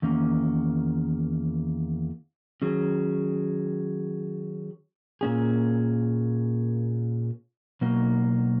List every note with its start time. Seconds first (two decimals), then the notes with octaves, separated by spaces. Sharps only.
0.02 E2 D#3 A#3 C#4
2.62 D#3 F#3 C#4 G#4
5.21 A#2 A#3 C#4 G#4
7.81 B2 F#3 A#3 D#4